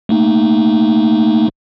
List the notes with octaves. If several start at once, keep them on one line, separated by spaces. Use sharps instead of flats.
A3 A#3 D#4